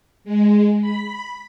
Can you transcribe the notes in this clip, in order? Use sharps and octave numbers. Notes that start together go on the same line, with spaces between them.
G#3
B5